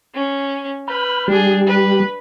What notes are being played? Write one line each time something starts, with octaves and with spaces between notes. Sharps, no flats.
C#4
B4 B5 F6 G6
G3 D4 G4 G#4
B4